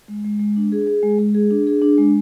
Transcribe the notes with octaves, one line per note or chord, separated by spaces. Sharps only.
G#3
G#3
G#3
D4
G#4
G#4
G#3
G#3
G#4
D4
G#4
D4
G#3